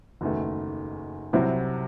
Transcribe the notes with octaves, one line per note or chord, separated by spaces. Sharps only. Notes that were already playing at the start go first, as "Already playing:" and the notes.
F#1 E2 D#3 A3
C2 C3 F#3 C4 E4